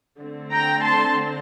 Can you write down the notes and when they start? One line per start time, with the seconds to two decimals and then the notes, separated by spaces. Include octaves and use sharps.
0.19 D3 A3 C4
0.51 G5 A#5
0.83 A5 C6